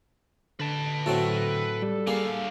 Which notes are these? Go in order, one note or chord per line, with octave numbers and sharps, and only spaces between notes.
D3 B4 A5
A2 F#3 C4 A4
G3
D3 A#3 G#4 F5